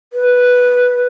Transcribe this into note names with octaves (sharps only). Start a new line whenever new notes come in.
B4